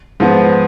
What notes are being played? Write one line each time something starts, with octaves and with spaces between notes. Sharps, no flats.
G#2 F3 B3